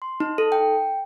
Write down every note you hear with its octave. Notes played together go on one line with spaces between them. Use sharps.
C6
D#4
A4
G5